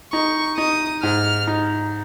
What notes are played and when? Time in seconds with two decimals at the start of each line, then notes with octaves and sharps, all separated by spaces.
0.13 D#4 C#6
0.58 D#4 D#6
1.03 G#2 F6
1.47 D#4